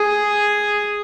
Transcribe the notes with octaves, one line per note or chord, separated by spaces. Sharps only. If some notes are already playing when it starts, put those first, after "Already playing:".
Already playing: G#4